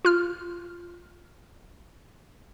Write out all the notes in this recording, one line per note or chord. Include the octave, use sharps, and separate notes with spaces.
F4 F6